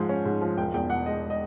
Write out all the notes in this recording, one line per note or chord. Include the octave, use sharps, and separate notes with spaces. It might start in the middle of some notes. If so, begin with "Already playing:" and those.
Already playing: G#2 F3 G#3
C#4
G#2
F3
E1 G5
E2 G5
B2 F#5
G#3 D#5
D#5